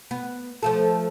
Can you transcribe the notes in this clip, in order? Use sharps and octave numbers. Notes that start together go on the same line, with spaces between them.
B3
F3 A3 A4